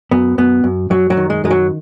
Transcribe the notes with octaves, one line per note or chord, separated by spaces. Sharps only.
F#2 B3
F#2 B3
F#2
F#2 F#3
F#3
D#3
G#3
F#2 G#3
F#3